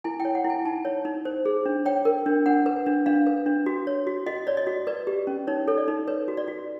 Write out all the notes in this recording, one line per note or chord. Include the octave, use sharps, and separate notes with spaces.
E4 G#5
G5
C#5
F#5
E4
G#5
D#4 A5
C#5
D#4
C5
G#4
D4
C#5 G5
A#4
D4
D4 F#5
B4
D4
D4 F5
B4
D4
F#4
C#5
F#4
F#4 D#5
C#5 D5
D#5
F#4
B4 D5
G4
C#4
D#4 C#5
A4 C#5
D5
D#4
B4 C#5
F#4
D5
F#4